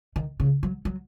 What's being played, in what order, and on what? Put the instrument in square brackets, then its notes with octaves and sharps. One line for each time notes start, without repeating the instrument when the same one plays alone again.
[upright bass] D#3
C#3
F#3
F#3